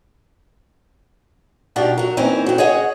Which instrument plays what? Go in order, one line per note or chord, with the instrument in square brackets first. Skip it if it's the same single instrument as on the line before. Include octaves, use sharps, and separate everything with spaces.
[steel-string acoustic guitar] B2 D4 D#4 F4 G4
F#3 A#4
A#2 E3 C4 C#4 D#4 A#4
F#3 C4
G#4 C#5 D#5 F#5